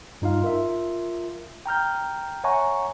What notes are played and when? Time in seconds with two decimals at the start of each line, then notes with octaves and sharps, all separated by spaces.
0.22 G2 D#4 F4 F5
0.42 F4 A#4 E5
1.66 G5 A#5 F6 G6
2.44 C#5 E5 F#5 G#5 A#5 C#6